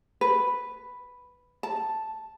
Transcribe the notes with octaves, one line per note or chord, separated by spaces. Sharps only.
B4
A5